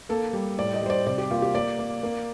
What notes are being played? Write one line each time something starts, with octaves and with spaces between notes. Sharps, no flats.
A#3 A4
G3
A2 D5
D#5
G3 C5
D5
C3 D5
G4
A#3 F4
G4
A#3 D5
A#3
A#3